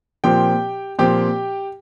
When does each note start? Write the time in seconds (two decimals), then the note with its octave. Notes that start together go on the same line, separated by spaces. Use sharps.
0.24 A#2 F3 C4 G4 G5
0.99 A#2 F3 C4 G4 G5